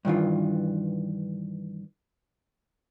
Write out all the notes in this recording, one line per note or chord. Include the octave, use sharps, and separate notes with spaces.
G2 D#3 E3 F4